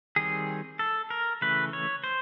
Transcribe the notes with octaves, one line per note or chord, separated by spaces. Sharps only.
D#3 G3 C4 G#4
A4
A#4
C#3 E3 A3 B4
C#5
C5